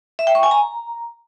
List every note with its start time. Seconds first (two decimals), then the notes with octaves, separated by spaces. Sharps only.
0.19 E5
0.27 G5
0.35 C#6
0.43 G#5
0.51 A#5